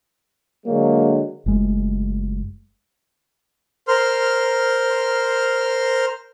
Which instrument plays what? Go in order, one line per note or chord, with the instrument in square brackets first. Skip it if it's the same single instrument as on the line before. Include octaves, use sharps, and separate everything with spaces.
[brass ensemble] D3 F#3 G#3 [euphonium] A#3
[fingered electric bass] F#1 G#3 A3
[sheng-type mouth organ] A#4 C5 C6 F6